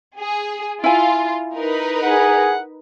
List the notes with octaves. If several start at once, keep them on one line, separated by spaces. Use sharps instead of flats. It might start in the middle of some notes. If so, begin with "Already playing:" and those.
G#4
E4 F4 G#5
D#4 A#4 B4
G#4 F#5